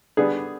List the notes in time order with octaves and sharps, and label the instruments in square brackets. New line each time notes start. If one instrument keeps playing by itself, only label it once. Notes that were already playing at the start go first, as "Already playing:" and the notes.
[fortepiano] D3 G3 B3 D4 G#4